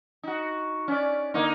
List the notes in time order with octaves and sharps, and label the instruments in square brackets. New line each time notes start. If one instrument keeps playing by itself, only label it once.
[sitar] D#4 F#4
C#4 D5
D3 A#3 D#4